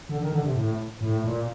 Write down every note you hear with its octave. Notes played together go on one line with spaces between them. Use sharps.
D3
D#3
D3
C3
A2
A2
A#2